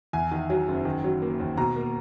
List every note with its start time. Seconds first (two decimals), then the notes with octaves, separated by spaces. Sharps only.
0.13 E2 G#5
0.31 D#3
0.50 F#3
0.68 F#1
0.85 D#3
1.04 F#3
1.22 A#3
1.40 D#2
1.57 B2 A#5
1.76 A#3